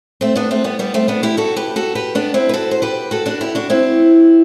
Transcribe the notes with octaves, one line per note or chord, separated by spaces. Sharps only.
A3 C4
B3 D4
A3 C4
G3 B3
G3 B3
A3 C4
B3 D4
E4 G4
F#4 A4
G4 B4
F#4 A4
G4 B4
B3 D4
C4 E4
B4
F#4 A4
C5
G4 B4
F#4 A4
D4 F#4
E4 G4
D4 F#4
C4 E4